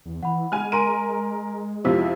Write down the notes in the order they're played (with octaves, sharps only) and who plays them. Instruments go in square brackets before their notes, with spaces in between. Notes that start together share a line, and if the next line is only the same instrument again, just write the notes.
[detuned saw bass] E2
[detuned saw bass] E3 [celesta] F#5 B5
[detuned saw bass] G#3 [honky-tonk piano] G#5 F6
[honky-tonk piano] A#4 D#7 [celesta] G#5 C6 D7
[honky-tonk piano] F2 C3 F3 [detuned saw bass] G#3 [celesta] E4 E6 B6